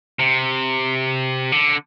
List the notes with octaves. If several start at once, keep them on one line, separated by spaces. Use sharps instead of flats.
C3
D3